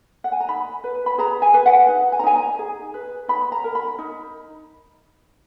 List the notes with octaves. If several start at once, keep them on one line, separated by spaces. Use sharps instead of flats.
F#5
G#5
A#5
D#4 B5
B4
B5
G#4 A#5
G#5
B4
F#5
D#4
G#5
A#5
D#4 G#5
A#5
G#4
B4
D#4 B5
A#5
A#4
B5
D#4